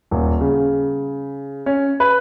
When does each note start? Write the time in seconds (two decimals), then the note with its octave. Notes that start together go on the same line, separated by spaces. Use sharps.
0.11 D#1
0.41 C#3
1.66 C#4
2.00 B4